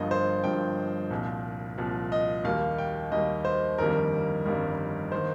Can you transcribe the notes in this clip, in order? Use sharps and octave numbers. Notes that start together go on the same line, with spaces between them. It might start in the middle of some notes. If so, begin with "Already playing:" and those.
Already playing: G1 G2 F3 A#3 D#5
C5
G1 G2 F3 A#3 G5
C2 A#2 F3
C2 A#2 F3
D#5
D#2 D#3 G3 A#3 F5
G5
D#2 D#3 G3 A#3 D#5
C5
G1 F2 D#3 G3 A#3 A#4
G1 F2 D#3 G3 A#3
D#3 A#3 C5